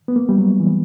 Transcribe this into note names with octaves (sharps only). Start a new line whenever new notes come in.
B3
A#3
G3
F#3
E3